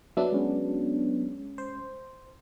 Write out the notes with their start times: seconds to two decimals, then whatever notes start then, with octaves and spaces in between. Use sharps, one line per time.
0.17 F#3 B3 D4 E5
0.32 G#3 C#4
1.58 C5